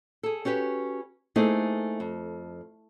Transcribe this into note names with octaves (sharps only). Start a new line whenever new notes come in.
G#4 A4
C#4 F#4 G4 B4
A3 A#3 C4 D#4 E4 G#4
F2